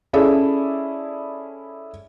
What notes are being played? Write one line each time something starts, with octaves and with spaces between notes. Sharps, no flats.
C#4 E4 G#4 A4 D5